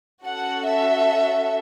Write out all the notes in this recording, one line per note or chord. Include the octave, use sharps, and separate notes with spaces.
C#4 F#4 A4 F#5
E5